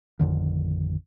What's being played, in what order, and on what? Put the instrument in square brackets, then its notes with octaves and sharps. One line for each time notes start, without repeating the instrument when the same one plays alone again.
[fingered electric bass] A1 F2 D3 D#3